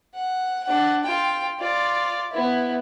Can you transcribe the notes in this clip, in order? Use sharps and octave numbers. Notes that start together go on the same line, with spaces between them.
F#5
D4 F#5
F4 G5
F4 D5
B3 E4